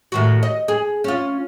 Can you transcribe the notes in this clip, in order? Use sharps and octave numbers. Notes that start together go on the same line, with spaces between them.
A2 D#3 F#4
D#5
G#4
C#4 F4